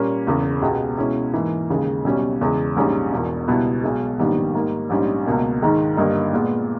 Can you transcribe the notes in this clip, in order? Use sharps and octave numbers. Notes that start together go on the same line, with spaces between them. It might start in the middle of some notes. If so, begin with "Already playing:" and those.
Already playing: A#2 G3 A#3 C#4
E1 E2 C#3
C#2 B2 G#3 B3 G4
B2 G#3 C#4 E4
G#2 E3 A#3
D#2 C#3 G#3
B1 B2 G3 C#4
E2 C#3 G#3
A#1 G#2 G3 C#4 G#4
E1 E2 B2
C#2 B2 G3 B3 E4
B1 B2 G#3
A#1 G#2 D#3 G3 B3
G#2 G3 A#3
A#1 G#2 G3 C#4
C#2 B2 A#3
G#2 D#3 G#3
G1 G2 G3 A#3 D#4
A#2 G#3 B3